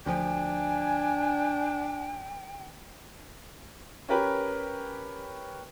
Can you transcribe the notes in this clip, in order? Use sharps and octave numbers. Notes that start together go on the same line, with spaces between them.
D2 F3 D4 G5 G#5
C#4 G4 A#4 B4